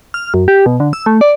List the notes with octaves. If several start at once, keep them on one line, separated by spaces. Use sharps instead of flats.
F6
F#2
G4
B2
D3
E6
A3
D5